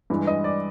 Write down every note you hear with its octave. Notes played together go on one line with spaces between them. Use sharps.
G2 E3 G#3
D#5
D5